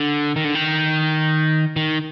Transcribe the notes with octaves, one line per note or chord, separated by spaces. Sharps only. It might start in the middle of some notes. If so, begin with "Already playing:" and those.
Already playing: D3
D#3
D3
D#3
D#3